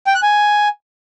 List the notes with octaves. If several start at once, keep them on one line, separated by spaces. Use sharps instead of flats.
G5
F#6
G#5